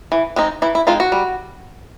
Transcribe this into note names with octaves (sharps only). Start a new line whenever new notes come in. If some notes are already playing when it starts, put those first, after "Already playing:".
E3
G#3 C4 D#4
E3 E4
E4
G#3 C4 D#4 F4
F#4
G3